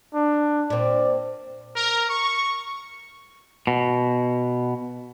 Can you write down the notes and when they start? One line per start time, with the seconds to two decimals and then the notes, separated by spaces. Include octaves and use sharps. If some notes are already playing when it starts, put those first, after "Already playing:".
0.14 D4
0.70 A#2 C4 D5
1.76 A#4
2.09 C#6
3.67 B2